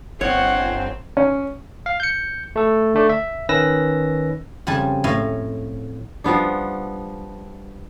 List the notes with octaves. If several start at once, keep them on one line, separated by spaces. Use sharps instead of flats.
G1 C4 C#5 F#5
C#4
F5
G6 C#7
A3 A4
D3 A3 D5
E5
D#3 C#4 B4 E6 A#6
F2 C#3 G3 G#5 A5
A2 C#5 D#5 F5 G#5 C6
F3 G3 B3 D4